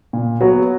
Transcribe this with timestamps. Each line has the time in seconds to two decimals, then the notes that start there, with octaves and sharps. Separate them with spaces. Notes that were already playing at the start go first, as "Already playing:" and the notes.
0.13 A#2
0.40 F#3 B3 F#4